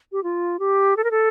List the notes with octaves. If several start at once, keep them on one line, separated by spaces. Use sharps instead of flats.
G4
F4
G4
A4
A#4
A4